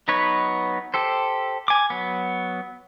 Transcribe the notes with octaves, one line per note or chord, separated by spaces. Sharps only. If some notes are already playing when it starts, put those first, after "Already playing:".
F#3 B3 D#4 B4 C#5
G4 A4 C5
G#5 D6
F#3 B3